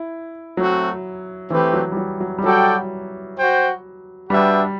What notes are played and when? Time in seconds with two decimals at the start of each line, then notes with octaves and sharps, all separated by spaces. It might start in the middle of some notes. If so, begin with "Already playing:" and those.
Already playing: E4
0.57 F#3 A3 C4 F#4
1.50 E3 A3 C4 G4 B4
1.74 F#3
1.92 G3
1.97 F#3
2.21 F#3
2.38 G3
2.44 F#3 F#4 A4 D5 G5
3.37 F#4 C5 G5
4.30 G3 D4 F#4 B4 E5 G5